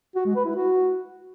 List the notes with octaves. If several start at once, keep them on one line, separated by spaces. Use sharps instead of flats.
F#4
G#3
B4
E4
F#4